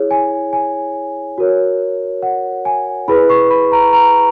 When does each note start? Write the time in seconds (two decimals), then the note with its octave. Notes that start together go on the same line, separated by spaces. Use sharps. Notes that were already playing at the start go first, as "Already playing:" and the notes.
Already playing: E4 G#4 C#5
0.11 G#5
0.53 G#5
1.38 F#4 A#4 C#5
2.22 F#5
2.65 G#5
3.08 E4 G#4 B4 B5
3.29 C#6
3.50 B5
3.72 A#5
3.93 A#5